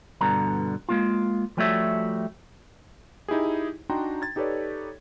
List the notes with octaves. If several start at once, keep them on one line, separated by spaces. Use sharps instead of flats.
G2 B2 D3 A#5
G#3 A#3 F4
F3 G3 A3 F#4 C#5 E5
D#4 E4 G4 G#4
D4 D#4 F#4 G5 A#5 C6
G#6 A6
D#4 G4 A4 B4 C#5 D5